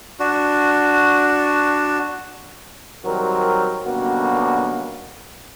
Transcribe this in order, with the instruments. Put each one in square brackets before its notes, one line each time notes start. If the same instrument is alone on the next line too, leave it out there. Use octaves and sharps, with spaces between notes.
[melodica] D4 F#4
[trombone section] D#3 F#3 G3 C4 A#4
F#2 B2 D3 G3 A#3 F#4